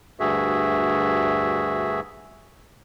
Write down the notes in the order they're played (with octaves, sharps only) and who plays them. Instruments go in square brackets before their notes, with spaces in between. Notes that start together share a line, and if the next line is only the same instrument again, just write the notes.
[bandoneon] D2 G2 F#4 G#4 E5